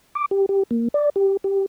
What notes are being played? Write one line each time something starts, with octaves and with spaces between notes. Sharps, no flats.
D6
G4
G4
A#3
D5
G4
G4